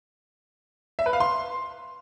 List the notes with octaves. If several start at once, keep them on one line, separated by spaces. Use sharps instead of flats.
E5
B4
F5
C6